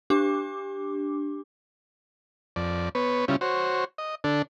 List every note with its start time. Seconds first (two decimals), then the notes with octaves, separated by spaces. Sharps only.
0.10 D4 G4 D6
2.56 F2 D5
2.95 B3 B4 C#5
3.28 C#3 G3 C#4 E4 F4
3.41 F#4 C5 C#5
3.98 D#5
4.24 D3 D4 A4